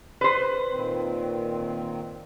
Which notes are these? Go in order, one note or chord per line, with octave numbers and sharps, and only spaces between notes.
B4 C5
A#2 D#3 C4